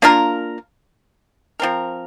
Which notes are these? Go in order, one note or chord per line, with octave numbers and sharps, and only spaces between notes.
A#3 D4 F4 A#4
F3 C4 A#4